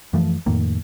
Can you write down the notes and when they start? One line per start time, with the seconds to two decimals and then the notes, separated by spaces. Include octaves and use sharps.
0.13 F#2 E3 F3 A3
0.46 F2 A2 D#3 A#3